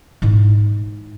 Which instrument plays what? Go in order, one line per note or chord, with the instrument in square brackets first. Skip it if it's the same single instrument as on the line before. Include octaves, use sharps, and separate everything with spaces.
[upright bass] G#2 E4